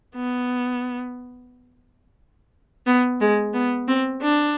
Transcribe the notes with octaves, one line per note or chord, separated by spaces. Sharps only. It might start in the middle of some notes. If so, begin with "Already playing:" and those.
B3
B3
G#3
B3
C4
D4